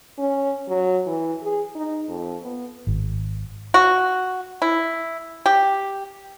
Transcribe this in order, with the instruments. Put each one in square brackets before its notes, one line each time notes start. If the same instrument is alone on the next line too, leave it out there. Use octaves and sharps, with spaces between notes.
[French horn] C#4
F#3
E3
G#4
D#4
F2
B3
[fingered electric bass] G#1
[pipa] F#4
E4
G4